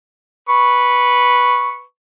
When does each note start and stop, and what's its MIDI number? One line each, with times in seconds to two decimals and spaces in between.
0.49 1.83 71
0.49 1.83 85